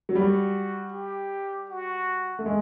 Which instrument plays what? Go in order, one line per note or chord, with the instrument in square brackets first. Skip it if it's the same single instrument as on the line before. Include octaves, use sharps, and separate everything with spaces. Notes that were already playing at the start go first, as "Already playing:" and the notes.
[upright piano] F#3
[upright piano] G3 [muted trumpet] F#4
[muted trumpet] G4
F#4
[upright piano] A3
G#3